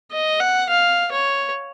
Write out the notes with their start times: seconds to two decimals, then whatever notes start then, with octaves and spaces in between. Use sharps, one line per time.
0.12 D#5
0.40 F#5
0.70 F5
1.12 C#5